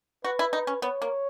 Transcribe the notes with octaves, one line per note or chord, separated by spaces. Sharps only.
F#4 B4
E4
D#4
C#4
B3 C#5
A#3